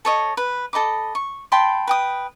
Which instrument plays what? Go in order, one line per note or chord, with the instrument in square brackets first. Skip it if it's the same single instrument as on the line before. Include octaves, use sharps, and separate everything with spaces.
[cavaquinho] A4 C#5 D#5
B4
A4 D#5 B5 D6
C#6
G5 A5 B5 C6
B4 G5 D#6